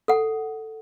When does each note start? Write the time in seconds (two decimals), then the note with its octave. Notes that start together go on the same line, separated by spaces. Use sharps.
0.08 A4 F#5